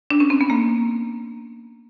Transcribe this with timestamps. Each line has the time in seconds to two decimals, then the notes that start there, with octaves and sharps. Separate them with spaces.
0.10 D4
0.20 C#4
0.30 C4
0.41 B3
0.50 A#3